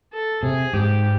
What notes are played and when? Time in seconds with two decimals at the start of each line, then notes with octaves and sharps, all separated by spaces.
0.13 A4
0.43 C3 G#4
0.73 G#2 G4